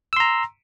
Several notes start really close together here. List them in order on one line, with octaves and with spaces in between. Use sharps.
E6 C6 A#5